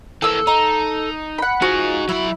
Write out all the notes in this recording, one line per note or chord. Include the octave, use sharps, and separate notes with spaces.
E3 A#3 A4 E6
D#4 A#5
F#5 B5
F3 D#4 F#4 G#4
F#3 E4 B5